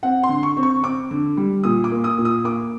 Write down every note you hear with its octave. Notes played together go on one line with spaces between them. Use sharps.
C4 F#5
C6
D3
C#6
C4
C#6
C4 D6
D3
G3
A#2 D#6
D6
A#3
D#6
A#2
D#6
A#3 D6